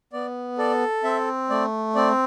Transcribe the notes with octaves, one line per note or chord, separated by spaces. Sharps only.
B3 D5
A4 D5
C4 E5
A3 D5
C4 D5